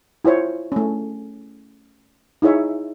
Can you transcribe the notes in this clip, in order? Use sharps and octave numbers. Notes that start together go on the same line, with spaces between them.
E4 F4 C5 C#5
A3 C#4
D#4 E4 G#4 C#5 E5